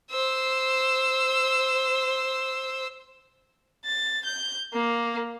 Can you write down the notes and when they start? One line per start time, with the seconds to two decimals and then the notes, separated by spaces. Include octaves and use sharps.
0.11 C5 E6
3.85 A6
4.25 G6
4.74 A#3